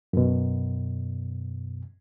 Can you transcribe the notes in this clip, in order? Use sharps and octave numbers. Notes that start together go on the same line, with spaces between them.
F#2 B2